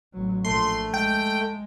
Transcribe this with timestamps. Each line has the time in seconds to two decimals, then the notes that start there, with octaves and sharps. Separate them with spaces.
0.13 A1 F#3
0.45 A#1 A#2 A3 C6
0.94 G#3 G5